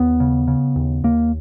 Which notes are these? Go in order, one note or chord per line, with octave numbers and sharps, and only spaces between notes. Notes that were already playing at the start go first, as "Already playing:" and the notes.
Already playing: D#2 B3
C#3
C#3
D#2
D#2 A#3